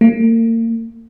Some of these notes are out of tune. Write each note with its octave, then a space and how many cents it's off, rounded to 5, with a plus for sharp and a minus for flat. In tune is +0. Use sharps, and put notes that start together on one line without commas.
A#3 -40